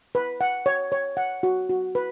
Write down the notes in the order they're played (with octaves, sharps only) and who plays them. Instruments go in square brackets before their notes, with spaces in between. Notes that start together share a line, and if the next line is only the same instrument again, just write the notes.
[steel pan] B4
F#5
C#5
C#5
F#5
F#4
F#4
B4